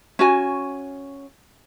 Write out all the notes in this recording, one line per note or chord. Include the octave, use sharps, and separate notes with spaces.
C#4 F#4 G#5